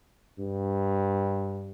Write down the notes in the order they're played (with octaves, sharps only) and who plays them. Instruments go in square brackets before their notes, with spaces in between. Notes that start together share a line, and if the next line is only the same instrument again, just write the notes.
[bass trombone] G2